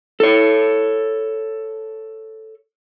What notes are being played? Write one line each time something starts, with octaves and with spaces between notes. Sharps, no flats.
A4 C#5